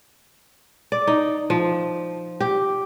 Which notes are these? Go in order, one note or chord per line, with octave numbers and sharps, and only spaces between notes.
D5
D#4
F3
G4